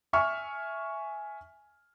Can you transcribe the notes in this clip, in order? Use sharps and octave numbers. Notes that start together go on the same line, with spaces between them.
E5 G#5 C#6 F6